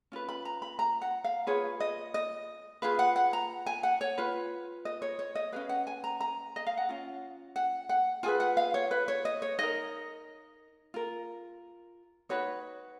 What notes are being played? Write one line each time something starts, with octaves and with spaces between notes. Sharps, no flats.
C#4 F4 B4
B5
A#5
B5
A#5
F#5
F5
F4 G#4 B4 C#5
D#5
D#5
F4 G#4 B4 F5
F#5
F#5
A#5
G#5
F#5
C#5
F4 B4
D#5
C#5
C#5
D#5
C#4 G#4 B4 F5
F#5
G#5
A#5
A#5
D#5
F5
F#5
C#4 F4
F#5
F#5
F4 G#4 B4 G#5
F#5
F5
C#5
B4
C#5
D#5
C#5
D#4 A#4 D#5
F4 A#4
D#4 F#4 B4 C#5